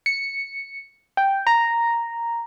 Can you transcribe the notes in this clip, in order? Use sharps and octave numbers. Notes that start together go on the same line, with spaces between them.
C#7
G5
A#5